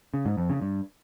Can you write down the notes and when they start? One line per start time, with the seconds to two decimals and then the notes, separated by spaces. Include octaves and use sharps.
0.14 C#3
0.26 G#2
0.38 F2
0.50 C#3
0.62 G2